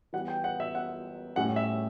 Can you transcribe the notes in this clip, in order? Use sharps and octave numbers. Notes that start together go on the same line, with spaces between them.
E3 G3 B3 F#5
G5
F#5
E5
F#5
A2 G3 C#4 F#5
E5